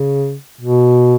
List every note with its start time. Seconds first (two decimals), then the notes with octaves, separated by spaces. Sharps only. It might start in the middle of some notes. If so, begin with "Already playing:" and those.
Already playing: C#3
0.61 B2